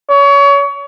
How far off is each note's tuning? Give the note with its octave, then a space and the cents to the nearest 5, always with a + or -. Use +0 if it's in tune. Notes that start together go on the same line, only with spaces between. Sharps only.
C#5 +30